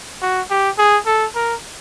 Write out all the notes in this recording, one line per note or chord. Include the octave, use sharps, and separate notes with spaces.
F#4
G4
G#4
A4
A#4